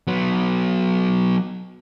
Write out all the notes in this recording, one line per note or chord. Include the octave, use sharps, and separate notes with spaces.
F#3 B3